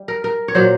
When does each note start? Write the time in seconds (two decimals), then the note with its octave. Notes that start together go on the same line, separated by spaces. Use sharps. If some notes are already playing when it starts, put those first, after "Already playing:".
Already playing: G3
0.08 A#4
0.24 A#4
0.48 C#5
0.55 A#2 F#3 C5